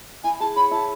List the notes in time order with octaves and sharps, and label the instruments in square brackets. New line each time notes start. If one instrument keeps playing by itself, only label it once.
[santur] E4 [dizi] G#5
[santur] G#4 [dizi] A5
[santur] C#5 [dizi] B5
[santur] E4 [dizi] A5